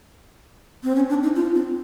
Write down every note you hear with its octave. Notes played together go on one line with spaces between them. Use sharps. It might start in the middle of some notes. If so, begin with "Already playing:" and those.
C4
C#4
D4
D#4
F4
C4